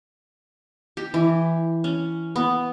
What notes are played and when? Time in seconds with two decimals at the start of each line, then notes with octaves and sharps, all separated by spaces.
0.97 G4
1.14 E3
1.84 C#4
2.36 B3